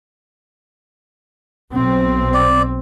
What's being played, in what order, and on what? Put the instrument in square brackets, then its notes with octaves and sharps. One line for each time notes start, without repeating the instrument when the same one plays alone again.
[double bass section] B1 C4
[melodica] D5